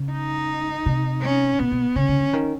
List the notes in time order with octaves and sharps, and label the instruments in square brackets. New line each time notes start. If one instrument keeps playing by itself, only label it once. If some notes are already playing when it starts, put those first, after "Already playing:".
Already playing: [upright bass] C#3
[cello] D#4
[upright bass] C3
[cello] C#4
[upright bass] B2 [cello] B3
[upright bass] B2
[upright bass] C#3 [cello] C#4
[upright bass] C#3
D3
D#3